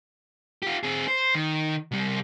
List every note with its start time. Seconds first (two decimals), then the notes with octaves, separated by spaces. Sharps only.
0.63 F4 G4
0.83 C4 G#4
1.08 C5
1.35 D#3
1.91 C2 G3